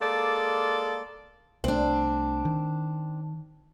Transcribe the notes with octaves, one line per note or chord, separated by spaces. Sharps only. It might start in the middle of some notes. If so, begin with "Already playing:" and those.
G#3 A#3 A4 D5
C2 A3 C4 D4
D#3